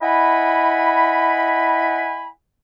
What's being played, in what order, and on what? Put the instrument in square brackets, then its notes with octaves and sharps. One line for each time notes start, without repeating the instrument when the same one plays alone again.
[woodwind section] E4 D#5 F#5 G#5 B5